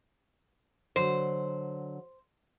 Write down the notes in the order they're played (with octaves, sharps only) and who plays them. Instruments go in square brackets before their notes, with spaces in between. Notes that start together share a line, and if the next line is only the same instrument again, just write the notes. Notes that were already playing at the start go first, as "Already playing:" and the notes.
[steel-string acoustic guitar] D3 F#3 [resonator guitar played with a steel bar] C5